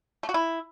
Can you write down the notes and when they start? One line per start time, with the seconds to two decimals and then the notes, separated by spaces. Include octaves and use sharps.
0.23 A3
0.29 F#4
0.34 E4